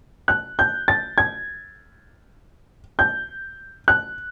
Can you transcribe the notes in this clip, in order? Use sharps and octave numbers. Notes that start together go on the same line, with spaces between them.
F#6
G6
A6
G#6
G6
F#6